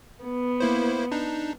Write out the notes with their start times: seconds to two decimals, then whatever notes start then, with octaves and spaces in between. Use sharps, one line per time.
0.24 B3
0.60 A#3 E4 C5
1.12 D4 D#4